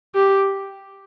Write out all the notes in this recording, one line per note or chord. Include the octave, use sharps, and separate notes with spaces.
G4